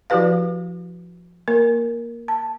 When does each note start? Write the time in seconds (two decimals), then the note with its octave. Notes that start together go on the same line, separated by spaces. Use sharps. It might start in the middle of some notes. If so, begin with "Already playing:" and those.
0.10 F3 E4 F#4 G4 B4 F5
1.48 A#3 A#4
2.28 A5